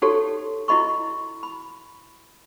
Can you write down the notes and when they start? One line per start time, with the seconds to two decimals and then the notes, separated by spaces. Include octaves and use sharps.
0.02 D#4 F#4 G4 A4 C#5
0.68 E4 F#4 D#5 B5 C#6
1.43 B5